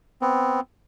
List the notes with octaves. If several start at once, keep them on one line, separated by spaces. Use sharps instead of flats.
B3 C4